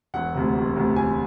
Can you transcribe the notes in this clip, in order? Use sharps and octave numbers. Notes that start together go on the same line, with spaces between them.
E1 F#5
D2 C3
E1
D2 C3
E1 G#5